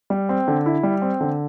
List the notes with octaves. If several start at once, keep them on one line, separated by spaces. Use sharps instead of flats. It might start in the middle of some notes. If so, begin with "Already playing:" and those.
G3
C4
D3
E4
G3
C4
D3